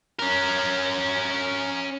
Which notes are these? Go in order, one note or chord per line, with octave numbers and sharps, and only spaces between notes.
C#4 A#4